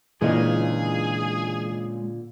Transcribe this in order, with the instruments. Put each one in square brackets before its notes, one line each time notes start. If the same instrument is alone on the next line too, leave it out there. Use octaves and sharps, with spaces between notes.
[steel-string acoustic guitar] A#2 D3 [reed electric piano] E3 D#5 [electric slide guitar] G#3 C#4 [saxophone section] G#4